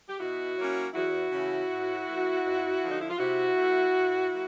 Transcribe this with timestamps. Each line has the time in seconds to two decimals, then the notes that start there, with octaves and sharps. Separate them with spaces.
0.09 G4
0.19 B2 E4 F#4
0.57 F#3 A#3 C#4
0.94 E2 E4 F#4
1.32 C#3 E3 A3 C#4
1.70 A2
2.07 E3 A3
2.44 F2
2.82 D3 F3
2.91 D#4
3.01 E4
3.10 F4
3.19 C3 E4 F#4
3.57 E3 A3
3.94 A2
4.32 F#3 A#3